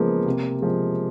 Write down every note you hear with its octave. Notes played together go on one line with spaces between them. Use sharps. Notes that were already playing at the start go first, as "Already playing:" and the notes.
Already playing: C#3 F3 G#3 A#3 B3
C3
F3 G#3